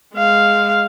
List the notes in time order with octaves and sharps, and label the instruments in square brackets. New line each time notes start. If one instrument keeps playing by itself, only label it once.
[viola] G#3 F5